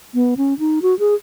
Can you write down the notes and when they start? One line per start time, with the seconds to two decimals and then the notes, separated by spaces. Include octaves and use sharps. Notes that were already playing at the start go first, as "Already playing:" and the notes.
0.14 B3
0.37 C#4
0.59 D#4
0.82 F#4
0.99 G#4